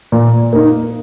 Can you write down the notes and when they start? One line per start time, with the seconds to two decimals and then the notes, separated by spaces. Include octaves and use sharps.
0.12 A#2
0.53 A#3 D#4